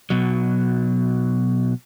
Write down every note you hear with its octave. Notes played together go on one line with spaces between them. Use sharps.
B2 F#3